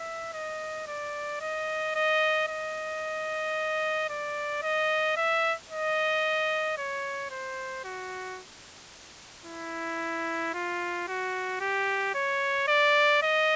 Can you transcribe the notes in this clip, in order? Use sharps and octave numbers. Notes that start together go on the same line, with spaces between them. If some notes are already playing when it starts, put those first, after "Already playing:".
Already playing: E5
D#5
D5
D#5
D#5
D#5
D5
D#5
E5
D#5
C#5
C5
F#4
E4
F4
F#4
G4
C#5
D5
D#5